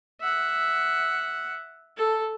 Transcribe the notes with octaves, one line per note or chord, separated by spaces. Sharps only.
E5 F#5
A4